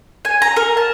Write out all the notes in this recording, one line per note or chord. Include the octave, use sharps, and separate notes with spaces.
G#5
A#5
A#4
A5